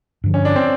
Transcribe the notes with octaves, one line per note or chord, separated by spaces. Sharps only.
G2 D3 F3
C#4
D4
C4